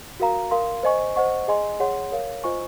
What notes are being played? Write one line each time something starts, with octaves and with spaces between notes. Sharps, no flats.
F#4 A#4 F5 A#5
A#4 F5 C6
C5 D#5 G#5 C#6
C5 D#5 F#5 C#6
G#4 D#5 G#5 C6
G#4 C#5 F#5 C6
A#4 C#5 F5
F4 C5 D#5 G#5 C#6